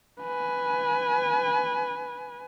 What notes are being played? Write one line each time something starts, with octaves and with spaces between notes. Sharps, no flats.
B4 G#5